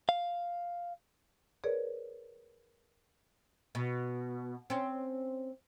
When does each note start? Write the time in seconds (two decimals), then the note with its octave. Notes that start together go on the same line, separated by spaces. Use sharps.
0.09 F5
1.64 G#4 A#4 B4 C#5 D5
3.75 B2
4.70 C4 C#4